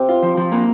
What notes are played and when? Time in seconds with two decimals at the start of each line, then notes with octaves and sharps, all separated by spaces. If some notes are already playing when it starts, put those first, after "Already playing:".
Already playing: C3
0.09 F4
0.23 F3
0.37 F3
0.52 A#3